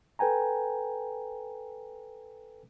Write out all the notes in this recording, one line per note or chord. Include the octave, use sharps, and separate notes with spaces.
A4 B4 G5 G#5 A#5